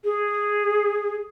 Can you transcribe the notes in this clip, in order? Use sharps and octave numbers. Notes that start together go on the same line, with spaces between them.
G#4